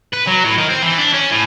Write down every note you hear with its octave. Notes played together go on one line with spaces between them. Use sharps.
B4
F#3
A2
D#3
C4
E3
D4
C#4
A2